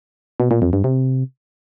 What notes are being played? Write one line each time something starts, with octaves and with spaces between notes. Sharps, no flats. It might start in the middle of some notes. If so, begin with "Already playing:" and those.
B2
A#2
F2
G2
C3